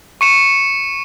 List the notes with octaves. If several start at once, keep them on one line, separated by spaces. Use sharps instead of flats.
C#6 C#7 E7